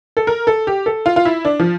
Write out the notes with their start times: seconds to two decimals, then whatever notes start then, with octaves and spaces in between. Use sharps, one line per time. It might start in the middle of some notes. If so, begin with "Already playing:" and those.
0.17 A4
0.27 A#4
0.47 A4
0.67 G4
0.86 A4
1.06 F4
1.16 F4
1.25 E4
1.45 D4
1.60 F3